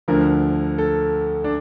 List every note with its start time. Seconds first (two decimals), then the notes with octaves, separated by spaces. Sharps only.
0.08 D2 D3 F3 A#4
0.78 A4
1.44 D4